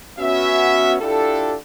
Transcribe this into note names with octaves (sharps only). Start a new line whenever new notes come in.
B3 C#4 F#4 E5
D4 E4 F4 G4 A4